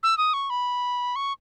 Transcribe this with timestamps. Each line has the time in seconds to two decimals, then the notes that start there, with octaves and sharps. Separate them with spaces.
0.03 E6
0.18 D#6
0.34 C#6
0.50 B5
1.16 C#6